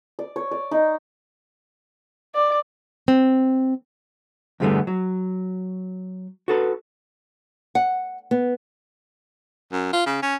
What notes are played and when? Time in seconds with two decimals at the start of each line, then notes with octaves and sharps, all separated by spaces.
0.19 D5
0.36 C#5
0.51 D5
0.71 D#4
2.35 D5
3.08 C4
4.60 E2 G2 D3 G3 A3 B3
4.87 F#3
6.48 F#4 A4 B4
7.75 F#5
8.31 B3
9.72 F#2
9.93 F4
10.06 C#3
10.22 C#4